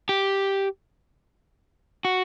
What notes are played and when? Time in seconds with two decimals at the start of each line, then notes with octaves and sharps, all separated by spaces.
0.09 G4
2.05 F#4